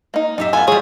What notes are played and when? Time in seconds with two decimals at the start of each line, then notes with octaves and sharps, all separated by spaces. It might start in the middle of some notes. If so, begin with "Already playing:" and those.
0.14 A#3 D#4
0.38 F#2 D#4 G4 E5
0.53 B3 F4 A4 G#5
0.67 G3 G#3 G#4 C#5